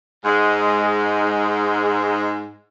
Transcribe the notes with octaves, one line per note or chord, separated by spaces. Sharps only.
G#2 G#3